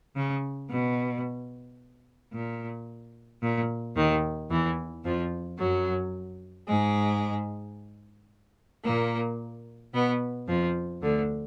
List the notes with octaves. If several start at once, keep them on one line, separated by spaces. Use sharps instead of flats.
C#3
B2
A#2
A#2
D#2 D#3
E2 E3
F2 F3
F#2 F#3
G#2 G#3
A#2 A#3
B2 B3
F2 F3
D2 D3